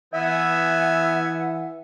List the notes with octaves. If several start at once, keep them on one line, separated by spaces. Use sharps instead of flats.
E3 B3 E5 F#5 G#5